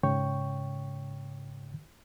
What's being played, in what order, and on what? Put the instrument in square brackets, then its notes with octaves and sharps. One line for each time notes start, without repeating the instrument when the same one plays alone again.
[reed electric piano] G#2 C#3 C#5 G5 C#6